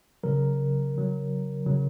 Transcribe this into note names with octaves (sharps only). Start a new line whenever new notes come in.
C#3 F#3 A#4
C#3 F#3
C#3 F#3